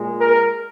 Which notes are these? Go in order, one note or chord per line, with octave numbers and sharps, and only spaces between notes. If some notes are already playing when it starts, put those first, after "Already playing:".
Already playing: A#2 G#3
A#4